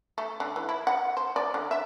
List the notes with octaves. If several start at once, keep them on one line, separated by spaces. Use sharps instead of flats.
A3
D3
E3
E4
F#5
C5
D5
D3
E5